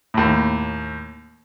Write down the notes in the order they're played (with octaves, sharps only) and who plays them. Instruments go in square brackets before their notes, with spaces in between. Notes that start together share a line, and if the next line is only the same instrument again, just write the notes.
[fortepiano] D#2 A2